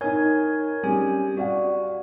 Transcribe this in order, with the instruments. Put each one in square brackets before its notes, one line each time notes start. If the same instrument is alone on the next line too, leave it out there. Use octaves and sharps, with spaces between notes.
[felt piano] D#4 G#6 [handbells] A#4 C#5 G#5
[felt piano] G3 C4 G4 [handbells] C#4 G#4 G#5
[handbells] F#4 [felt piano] D5 F5 F#5